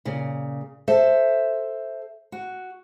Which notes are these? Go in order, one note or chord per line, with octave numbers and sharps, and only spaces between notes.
A#2 C#3
A4 C5 E5
F#4